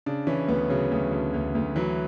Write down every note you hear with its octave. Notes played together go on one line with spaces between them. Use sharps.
C#3 D4
E3 C#4
D2 B3
C#3 F#3
D2
D2
D2
D2
E3 F#3